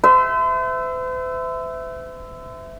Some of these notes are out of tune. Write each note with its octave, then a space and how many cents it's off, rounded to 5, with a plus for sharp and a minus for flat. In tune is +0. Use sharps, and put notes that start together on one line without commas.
C5 -45 E5 +0